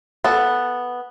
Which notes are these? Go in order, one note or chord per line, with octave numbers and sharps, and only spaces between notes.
B3 A4